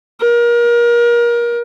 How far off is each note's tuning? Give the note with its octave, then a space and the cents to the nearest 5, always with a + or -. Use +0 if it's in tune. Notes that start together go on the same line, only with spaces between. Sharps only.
A#4 +30